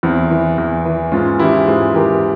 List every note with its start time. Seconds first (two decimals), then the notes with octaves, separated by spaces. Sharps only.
0.03 E2 C4 E4
0.31 E3
0.58 E2
0.85 E3
1.12 G#2 C#4 F4
1.39 E3 E4 G4
1.67 G#2 F4 G#4
1.94 E3 G4 A#4